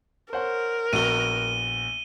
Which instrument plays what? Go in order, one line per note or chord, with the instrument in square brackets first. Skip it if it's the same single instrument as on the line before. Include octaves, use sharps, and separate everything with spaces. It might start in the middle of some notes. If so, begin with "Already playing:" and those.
[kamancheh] A#4 [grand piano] C5 C#5 F#5
[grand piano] A#1 B3 F#4 [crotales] D#7 G7